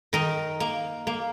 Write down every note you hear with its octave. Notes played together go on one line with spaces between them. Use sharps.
D#3 A#4 D#5
A#3
A#3